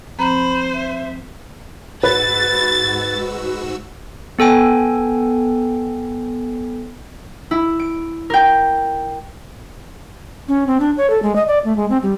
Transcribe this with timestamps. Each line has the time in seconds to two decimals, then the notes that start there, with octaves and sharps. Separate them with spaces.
0.19 F3 C4 C5 A#5 B5
0.73 E5
2.03 G#2 F#4 B4 E6 A6
4.39 B3 A4 G5 G#5
7.51 E4
7.79 D7
8.30 A#4 G5
10.48 C#4
10.67 C4
10.80 D4
10.97 C#5
11.10 A4
11.23 G#3
11.36 D#5
11.48 D5
11.65 A3
11.76 G#3
11.90 C4
12.03 G3